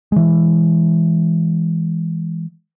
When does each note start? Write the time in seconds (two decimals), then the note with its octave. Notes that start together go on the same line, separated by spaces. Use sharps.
0.12 E3 G#3